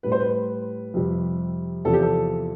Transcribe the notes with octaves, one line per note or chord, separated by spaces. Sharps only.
A2 G3 B4
C5
B4
F2 C3 G3
E2 C3 F3 A4
G4
A4